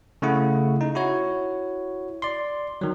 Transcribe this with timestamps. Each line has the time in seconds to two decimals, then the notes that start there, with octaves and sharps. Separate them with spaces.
0.22 C#3 A3 E4 F#5
0.81 D#4
0.95 E4 F#4 C#5
2.22 D5 C6
2.81 D#3 F#3